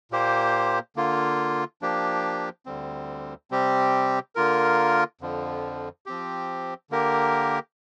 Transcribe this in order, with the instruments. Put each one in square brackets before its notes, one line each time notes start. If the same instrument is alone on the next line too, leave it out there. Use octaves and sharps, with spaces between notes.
[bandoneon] A#2 A#3 G4 C5
D3 A#3 F4
F3 A#3 D4 G4
D2 D3 G3 C4
C3 G3 C4 G4
D3 A#3 F4 A#4
F2 D3 F3
F3 C4 G4
D3 A#3 G4 A#4